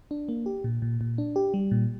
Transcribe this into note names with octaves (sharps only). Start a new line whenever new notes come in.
D4
A#3
G4
A#2
A#2
A#2
D4
G4
G3
A#2